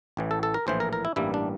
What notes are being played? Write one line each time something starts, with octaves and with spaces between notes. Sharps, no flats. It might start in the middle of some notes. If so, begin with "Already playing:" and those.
A1 A2 E3
A4
A4
A#4
A#1 A2 E3 C5
A#4
A#4
E4
A1 G2 E3 G3 A#3 E4
D4